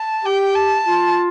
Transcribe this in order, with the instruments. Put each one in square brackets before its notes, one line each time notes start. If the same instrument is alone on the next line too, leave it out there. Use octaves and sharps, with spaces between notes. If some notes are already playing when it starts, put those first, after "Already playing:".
Already playing: [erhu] A5
[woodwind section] G4 [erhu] G5
[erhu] A5
[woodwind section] F4